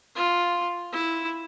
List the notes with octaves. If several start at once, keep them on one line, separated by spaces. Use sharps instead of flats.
F4
E4